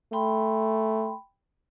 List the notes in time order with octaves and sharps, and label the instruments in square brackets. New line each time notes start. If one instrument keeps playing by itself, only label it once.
[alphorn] A3 [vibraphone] G5 B5 C6